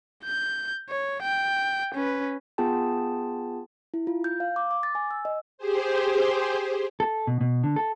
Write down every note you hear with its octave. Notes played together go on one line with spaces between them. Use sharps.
G6
C#5
G5
C#4 B4
B3 F4 G#4 G5 A5
E4
F4
G6
F5
D6
D6
A6
G#5
E6
D#5
G4 G#4 C5
A4
B2
B2
D3
A4